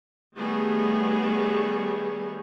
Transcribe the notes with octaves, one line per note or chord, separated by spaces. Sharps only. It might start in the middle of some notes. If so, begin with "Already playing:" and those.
D#3 G3 A3 B3 G#4 C#5